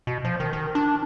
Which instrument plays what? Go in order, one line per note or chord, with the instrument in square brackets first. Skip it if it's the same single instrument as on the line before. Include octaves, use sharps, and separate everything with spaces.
[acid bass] B2
F3
D#3
D#3
D4